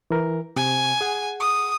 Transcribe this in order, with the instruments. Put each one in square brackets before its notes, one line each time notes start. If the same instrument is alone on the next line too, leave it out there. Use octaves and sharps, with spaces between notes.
[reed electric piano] E3 A#4
[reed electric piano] C3 [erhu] G#5
[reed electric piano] G#4 F#5
[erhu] D#6